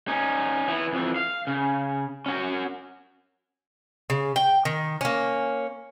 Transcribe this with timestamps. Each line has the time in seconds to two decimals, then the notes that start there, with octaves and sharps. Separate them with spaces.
0.08 C#4 D#4
0.68 E3 B3
0.93 F2 E3
1.16 F5
1.47 C#3
2.26 C#4 F#4
4.10 C#3
4.36 G5
4.65 D#3
5.01 A#3 C#4